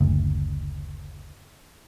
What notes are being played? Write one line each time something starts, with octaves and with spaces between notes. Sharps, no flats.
F#1 D2